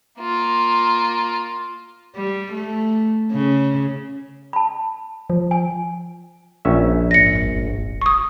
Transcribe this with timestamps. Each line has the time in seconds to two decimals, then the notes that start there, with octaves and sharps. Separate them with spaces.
0.19 A#3 F4
2.16 G3
2.53 A3
3.32 C#3
4.53 A5 B5
5.30 F3
5.51 G#5
6.65 A#1 C#4 E5
7.11 G#2 A3 A#6 C#7
7.35 D1 G1
8.02 C#6 D#6